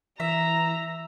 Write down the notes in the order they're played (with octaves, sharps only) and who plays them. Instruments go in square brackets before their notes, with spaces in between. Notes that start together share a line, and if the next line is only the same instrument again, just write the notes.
[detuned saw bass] E3 [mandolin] E5 [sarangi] A#5